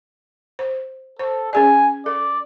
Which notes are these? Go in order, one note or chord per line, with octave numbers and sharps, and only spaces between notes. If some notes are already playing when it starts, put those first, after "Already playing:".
C5
A4 C5
C#4 G#4 D5 G#5
A4 D5